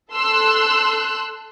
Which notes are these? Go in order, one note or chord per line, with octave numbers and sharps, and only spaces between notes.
A4 C6 E6 F#6